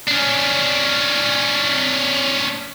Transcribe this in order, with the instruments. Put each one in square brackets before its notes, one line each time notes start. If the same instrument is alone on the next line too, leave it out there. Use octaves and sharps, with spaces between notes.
[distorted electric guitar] C#4 D4